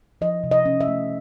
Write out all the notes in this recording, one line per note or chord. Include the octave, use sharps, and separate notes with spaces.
F3 D#5
C3
D#5
C#4
E5
A3